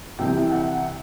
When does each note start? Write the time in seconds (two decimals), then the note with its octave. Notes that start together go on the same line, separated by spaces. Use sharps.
0.19 C2 C3 E3 G5
0.52 F#5